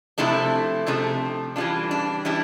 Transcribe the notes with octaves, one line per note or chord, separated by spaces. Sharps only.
C3 F3 A3 D4 E4
C3 F3 A3 D4
E3 G3 D4 F4
D4
E3 G3 D4 E4